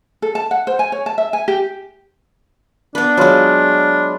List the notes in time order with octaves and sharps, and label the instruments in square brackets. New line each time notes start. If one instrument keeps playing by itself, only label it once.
[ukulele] A4
A5
F#5
C5
G#5
C#5
A5
E5
G#5
G4
[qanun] B3 B4 [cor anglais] D4
[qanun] F#3 G#3 [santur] F4 B4